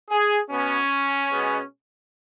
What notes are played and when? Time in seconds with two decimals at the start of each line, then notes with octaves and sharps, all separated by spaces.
0.10 G#4
0.50 B2 B3 C#4
1.31 B2 G#3 B3